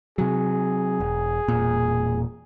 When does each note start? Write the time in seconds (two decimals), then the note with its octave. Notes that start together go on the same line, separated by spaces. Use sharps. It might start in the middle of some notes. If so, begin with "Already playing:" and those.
0.18 C3 F#3 G#4
1.00 E1
1.48 E1 A#2